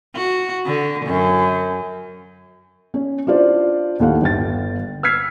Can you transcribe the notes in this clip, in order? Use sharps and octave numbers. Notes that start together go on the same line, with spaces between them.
F#4
D3
F#2
C#4
D4 E4 F4 C5 D5
D#2 A2 F5 F#5
G1 G5 A6
E6 F6 G#6 B6 C7